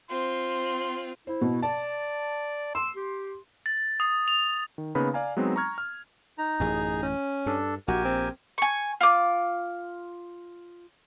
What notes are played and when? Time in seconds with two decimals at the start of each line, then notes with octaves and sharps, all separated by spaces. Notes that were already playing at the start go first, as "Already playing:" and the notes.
0.10 C4 F4 C6
1.27 E4 C5
1.41 B2
1.63 D5 A5
2.75 C6 E6
2.96 G4
3.66 A6
4.00 D#6
4.28 F7
4.78 D#3
4.95 C#3 A#3 B3 D#4 B4 B5
5.14 D5 F5 G#5 A#5
5.37 F#3 G#3 B3 C4 D#4
5.56 A#5 C#6 F6 G#6
5.78 F6
6.38 D#4 A#5
6.60 A1 F#2 G#4
7.03 C#4
7.46 G2 D4 A4
7.88 A#1 F#4 G4 A#4 G#5
8.05 C4
8.58 G#5 C#6
9.01 F4 D6